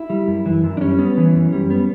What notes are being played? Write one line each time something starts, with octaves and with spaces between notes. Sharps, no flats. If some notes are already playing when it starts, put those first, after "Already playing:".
Already playing: E4
G3
F#2
E3
F#2
D4
G3 C#4
B3
E3
F#2
G3
B3